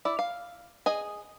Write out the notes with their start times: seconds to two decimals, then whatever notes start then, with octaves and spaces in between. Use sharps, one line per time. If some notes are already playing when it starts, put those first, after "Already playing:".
0.05 E4 D5
0.19 F5
0.86 G#4 D#5 G#5